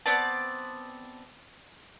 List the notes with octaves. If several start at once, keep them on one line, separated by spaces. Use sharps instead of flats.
B3 C4 D5 A5